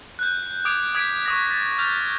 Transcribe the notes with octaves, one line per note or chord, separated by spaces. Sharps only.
F#6 G6
D6 D#6 G#6 D7 F7
D#6 G#6 B6 D7
C#6 D#6 A#6
A6 B6
F6 G6 F7